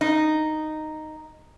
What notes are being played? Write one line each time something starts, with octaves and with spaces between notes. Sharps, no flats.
D#4